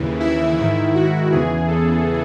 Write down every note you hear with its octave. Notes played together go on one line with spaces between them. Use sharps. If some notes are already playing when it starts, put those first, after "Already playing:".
Already playing: D#2 C#3 E3
E4
G#2 D#3 E4
F#4
E2 C#3 E3 G#4
A4